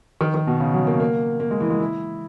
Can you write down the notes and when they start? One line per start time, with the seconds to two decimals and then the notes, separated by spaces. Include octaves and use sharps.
0.21 D#3
0.34 D#3
0.47 B2
0.60 C#3
0.74 F#3
0.87 A#3
1.00 A#3
1.40 A#3
1.51 G#3
1.60 E3
1.70 G#3
1.80 E4